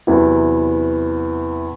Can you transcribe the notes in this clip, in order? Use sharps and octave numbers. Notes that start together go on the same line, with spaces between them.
E2 C3 F#3 B3 E4